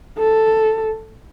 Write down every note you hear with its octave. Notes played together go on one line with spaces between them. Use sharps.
A4